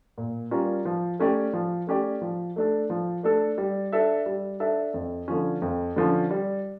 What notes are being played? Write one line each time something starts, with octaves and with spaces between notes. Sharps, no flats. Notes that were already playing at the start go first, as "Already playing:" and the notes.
A#2
G3 C#4 F4 A#4
F3
A3 C#4 G4 D5
F3
A3 C#4 G4 D5
F3
A3 D4 A4
F3
A3 D4 A4
G3
D4 A4 E5
G3
D4 A4 E5
F2
D3 F3 C#4
F2
D3 F3 C#4
G3